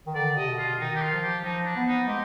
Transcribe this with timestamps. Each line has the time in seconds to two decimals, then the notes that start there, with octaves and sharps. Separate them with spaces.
0.07 D#3
0.15 D3 D5
0.37 C3 D#5
0.47 B2
0.58 F4
0.79 D#3 D#4
0.95 G4
1.01 F4
1.12 F3
1.22 G4
1.43 F3 D#4
1.65 D4
1.76 B3
1.87 D#4
2.08 G#3 G4